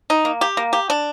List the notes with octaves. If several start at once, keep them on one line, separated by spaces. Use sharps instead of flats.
D#4
A#3
G4
A#3
G4
D4